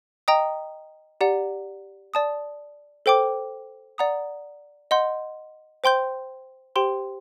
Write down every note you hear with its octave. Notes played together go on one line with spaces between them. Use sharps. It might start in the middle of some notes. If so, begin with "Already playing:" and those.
D#5 G5 A#5 D#6
G4 D5 F#5 A#5
D5 A5 D#6
A4 C5 G5 D6
D5 F#5 A#5 D#6
D#5 F#5 C6 G6
C5 G5 C6 G6
G4 C5 G5 C6